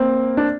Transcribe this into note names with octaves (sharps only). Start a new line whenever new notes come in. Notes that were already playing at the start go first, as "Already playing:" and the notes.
Already playing: A#3 C4
D4